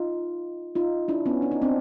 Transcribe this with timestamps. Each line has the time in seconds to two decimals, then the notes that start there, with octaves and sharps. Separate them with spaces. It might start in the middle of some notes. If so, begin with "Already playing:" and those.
Already playing: D#4 F4
0.75 D#4 F4
1.08 D4 E4
1.26 B3 C#4
1.42 D4
1.51 D#4
1.62 C4 D4